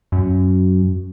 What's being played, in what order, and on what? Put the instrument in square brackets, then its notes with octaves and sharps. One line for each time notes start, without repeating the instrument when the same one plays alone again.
[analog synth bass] F#2